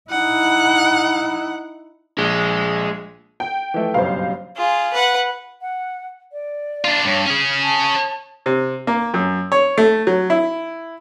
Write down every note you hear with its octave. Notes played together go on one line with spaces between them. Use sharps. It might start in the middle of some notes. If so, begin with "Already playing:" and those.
D#4 E4 F#5
A#1 G#3
G5
E3 F3 A3
F#1 B1 G2 C5 F5
F4 G#4
B4 F#5
F#5
D5
D4 F4
G2 C#5
C#4 G#4 F6
A5
C3
A#3
F#2
C#5
A3
F#3
E4